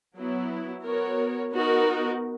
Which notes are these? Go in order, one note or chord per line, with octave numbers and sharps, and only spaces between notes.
F#3 B3 E4
B3 F#4 A#4 C#5
B3 D#4 F#4 A#4